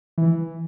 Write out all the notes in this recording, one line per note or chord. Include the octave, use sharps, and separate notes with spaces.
E3